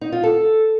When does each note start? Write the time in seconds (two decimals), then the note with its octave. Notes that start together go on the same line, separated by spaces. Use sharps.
0.01 D#4
0.12 F4
0.23 A4